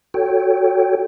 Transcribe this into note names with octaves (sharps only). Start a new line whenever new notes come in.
F#4 A4 C#5 G5